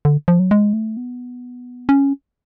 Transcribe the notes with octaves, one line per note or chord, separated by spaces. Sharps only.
D3
F3
F#3
G#3
A3
B3
C#4